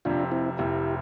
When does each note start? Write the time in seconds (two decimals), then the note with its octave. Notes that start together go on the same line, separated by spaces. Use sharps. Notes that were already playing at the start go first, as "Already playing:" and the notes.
0.05 F1 F2 C3 D4 F4
0.32 C4 E4
0.58 F1 F2 C3 E4 G4